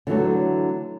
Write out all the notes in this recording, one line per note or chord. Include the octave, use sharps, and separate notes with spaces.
D3 E3 F#3 A3